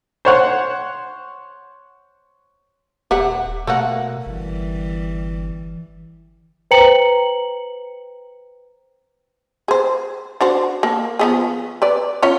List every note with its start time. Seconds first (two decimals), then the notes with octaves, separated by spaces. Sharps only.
0.25 C5 C#5 F#5
3.11 D#1 G4 E5 F#5
3.67 B2 A3 A#3 F#5
4.26 G1 E3 G3
6.71 B4 C5 G5 A#5 C#7 F#7
9.68 G#4 C5
10.41 D4 F#4 C5
10.83 A#3 A4
11.19 F3 B3 G#4
11.82 B4 D5
12.22 C#4 F4 C#5